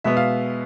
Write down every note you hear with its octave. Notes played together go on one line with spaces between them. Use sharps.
B2 G#3 B3 E5
F5